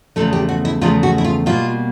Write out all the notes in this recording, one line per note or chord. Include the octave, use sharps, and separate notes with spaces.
E2 C#3 F3 A3 A4
G4
F#4
E4
E2 C#3 F3 A3 F4
F#4
E4
F4
B2 G3 A#3 F4